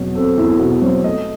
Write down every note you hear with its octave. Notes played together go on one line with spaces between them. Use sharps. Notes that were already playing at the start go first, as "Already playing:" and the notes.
Already playing: E2 B2 F#3
C4 A4
E2 E4
B2 F#4
F#3 C5
A3 D#5